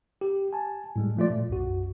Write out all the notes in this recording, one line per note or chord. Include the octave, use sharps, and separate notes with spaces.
G4
G#5 A5
A2 G3 G#3
F3 A3 F4 D5
A#2
B1 F#2 F#4